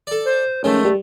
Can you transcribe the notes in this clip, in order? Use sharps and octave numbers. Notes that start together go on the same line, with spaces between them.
A4 D5
C5
G#2 D#3 F3 A3 C#4
G3